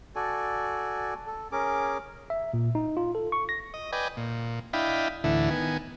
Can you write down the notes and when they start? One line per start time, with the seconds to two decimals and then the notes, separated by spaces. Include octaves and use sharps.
0.16 F#4 A4 D5 G#5
1.27 A4
1.52 C#4 G#4 A#4 D6
2.30 E5
2.54 A#2
2.75 D#4
2.97 F4
3.15 A4
3.32 C#6
3.49 A#6
3.74 D#5
3.93 B4 D5 D#5 G5 G#5
4.17 A#2
4.73 D4 E4 D#5 F5 G5 B5
5.24 D2 A2 D3 E3 E4
5.50 D#3 B3 G#5